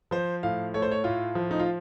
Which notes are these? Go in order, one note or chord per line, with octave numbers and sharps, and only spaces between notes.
F3 C5
A2 F5
A3 C#5
C5
C#5
A2 F4
F3
D#4
F4